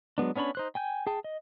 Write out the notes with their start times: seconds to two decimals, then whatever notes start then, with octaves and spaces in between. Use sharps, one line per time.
0.18 F#3 G#3 B3 D4
0.36 B3 C#4 D4 C#5 B5
0.55 D#4 C5 F#6
0.75 G5 G#5 G6
1.07 G#4 G5 A5
1.24 D#5